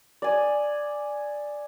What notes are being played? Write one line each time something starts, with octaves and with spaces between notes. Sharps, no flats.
D5 G#5 D#6